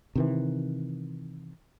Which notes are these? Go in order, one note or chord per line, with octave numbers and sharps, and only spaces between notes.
C3 D#3 E3